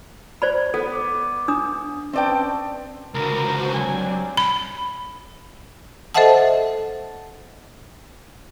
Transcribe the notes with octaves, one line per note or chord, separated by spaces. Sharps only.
C5 D5 B5
B3 A4
D6
D4 D#6
C4 C#4 B4 D5 G5 A5
C#2 D3 F#4 A#4 C5
F#3 G3 C4 D4 G#5
B5
A4 C5 D#5 E5 F#5 A5